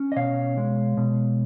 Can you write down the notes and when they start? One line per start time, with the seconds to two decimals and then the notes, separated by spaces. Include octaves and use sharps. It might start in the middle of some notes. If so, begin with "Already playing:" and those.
Already playing: C#4
0.12 D#5
0.16 B2 C#5 F5
0.57 G#3
0.97 B2